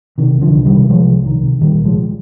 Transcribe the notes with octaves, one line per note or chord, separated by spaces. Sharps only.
C3 D#3
C2
D3 F3
C2
D#3 G3
C3
C3 F3 G#3
C2
C2 D#3
C3
A#2 D#3 G3
C2
F3 G#3